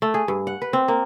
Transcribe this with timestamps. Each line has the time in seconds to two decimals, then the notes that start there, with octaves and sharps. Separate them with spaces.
0.02 A3
0.14 G#4
0.28 G2
0.47 F#5
0.62 B4
0.73 C4
0.88 A#3